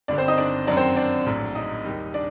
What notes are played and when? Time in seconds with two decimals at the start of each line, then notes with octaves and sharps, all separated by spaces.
0.08 G1 G2 D3 D4 D5
0.18 C4 C5
0.28 D#4 D#5
0.38 D4 D5
0.67 F#2 D#3 F#3 D4 D5
0.77 C4 C5
0.96 D4 D5
1.26 A#1 A2 F#3
1.55 D#4 D#5
1.85 D#2 D#3 G3
2.14 D4 D5